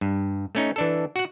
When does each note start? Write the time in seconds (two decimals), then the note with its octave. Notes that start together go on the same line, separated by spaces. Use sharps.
0.01 G2
0.55 A3 C#4 D#4
0.76 E3 D4 A4
1.16 F#4 F#5